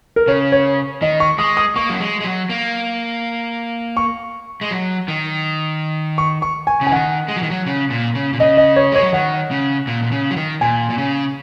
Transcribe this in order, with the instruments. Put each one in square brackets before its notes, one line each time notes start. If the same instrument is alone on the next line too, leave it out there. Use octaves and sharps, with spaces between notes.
[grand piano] A#4
[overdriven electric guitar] C#3 [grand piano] C#5
[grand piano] C#5
[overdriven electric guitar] D#3 [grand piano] D#5
[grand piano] C#6
[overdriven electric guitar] G#3 [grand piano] D#6
[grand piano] D#6
[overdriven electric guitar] A#3 [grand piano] C#6
[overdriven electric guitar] F#3
G#3
G#3
F#3
A#3
[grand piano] C#6
[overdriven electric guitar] G#3
F#3
D#3
[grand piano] C#6
C#6
G#5
[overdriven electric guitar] C#3
[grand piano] G#5
[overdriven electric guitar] D#3 [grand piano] F#5
[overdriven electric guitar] G#3
F#3
D#3
F#3
C#3
A#2
C#3
A#2
[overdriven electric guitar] C#3 [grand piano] D#5
[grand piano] D#5
C#5
[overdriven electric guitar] G#3 [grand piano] C#5
[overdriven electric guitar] F#3
[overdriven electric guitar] D#3 [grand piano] F#5
[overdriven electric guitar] C#3
A#2
A#2
C#3
F#3
D#3
[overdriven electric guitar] A#2 [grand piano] G#5
[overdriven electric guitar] A#2
C#3